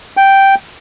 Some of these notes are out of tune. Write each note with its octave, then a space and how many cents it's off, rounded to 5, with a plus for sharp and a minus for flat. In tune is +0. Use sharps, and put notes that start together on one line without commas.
G5 -5